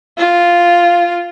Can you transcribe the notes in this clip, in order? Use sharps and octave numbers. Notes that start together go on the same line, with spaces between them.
F4